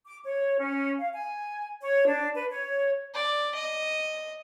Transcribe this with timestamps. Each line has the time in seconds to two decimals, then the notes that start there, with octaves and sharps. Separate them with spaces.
0.05 D6
0.24 C#5
0.57 C#4
1.00 F5
1.13 G#5
1.80 C#5
2.05 D4
2.33 B4
2.51 C#5
3.14 D5
3.55 D#5